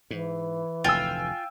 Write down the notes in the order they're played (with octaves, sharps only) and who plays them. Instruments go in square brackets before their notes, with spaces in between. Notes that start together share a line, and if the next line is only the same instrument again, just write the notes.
[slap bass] G#2 [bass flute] E3
[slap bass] F1 D2 A2 [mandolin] F4 [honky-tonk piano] G5 G#5 E6